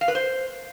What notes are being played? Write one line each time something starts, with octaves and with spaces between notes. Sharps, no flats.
F5
B4
C5